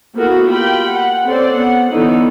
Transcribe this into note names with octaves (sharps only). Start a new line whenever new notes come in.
A#3 B3 E4 F#4 A4 A#4
F4 G4 G5 B5
F#5
C4 C#4 A4 C5 D5
B3 F#5
D3 E3 B3 C#4 D#4 E4